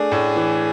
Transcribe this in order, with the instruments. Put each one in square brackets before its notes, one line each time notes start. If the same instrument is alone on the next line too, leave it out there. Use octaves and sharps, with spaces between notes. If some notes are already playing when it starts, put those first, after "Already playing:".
Already playing: [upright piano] A3 D4 [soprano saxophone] G#4
[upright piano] A2
E3